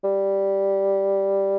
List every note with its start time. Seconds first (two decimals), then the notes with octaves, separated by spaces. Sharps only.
0.04 G3